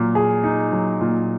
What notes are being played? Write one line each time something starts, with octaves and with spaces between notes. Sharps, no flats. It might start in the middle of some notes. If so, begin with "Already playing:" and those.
Already playing: A#2 F#3
G#4
D#4
F#3
A#2